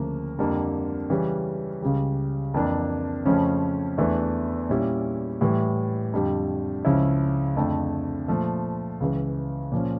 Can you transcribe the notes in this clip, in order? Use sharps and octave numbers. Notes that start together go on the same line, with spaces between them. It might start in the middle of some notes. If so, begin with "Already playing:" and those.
Already playing: D2 C#3 F3 A#3
F2 D3 G3 A#3
C#3 E3 G3 C#4
C#2 C#3 G3
F2 E3 A#3 D4
F2 C#3 F3 A3 C#4
E2 E3 A3 D4
A#2 G3 C#4 E4
A2 E3 G3
F2 D3 G3
C#2 C#3 F3 C#4 E4
F2 D3 A3
A#2 F3 A3
C#2 C#3 E3
A#2 F3 C#4